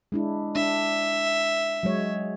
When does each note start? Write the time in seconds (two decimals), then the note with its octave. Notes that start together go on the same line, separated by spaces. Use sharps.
0.12 G#3 D4 E4
0.55 D4 E5
1.83 F#3 G#3 C#5